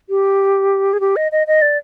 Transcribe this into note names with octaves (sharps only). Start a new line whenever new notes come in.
G4
G#4
G4
D#5
D#5
D#5
D5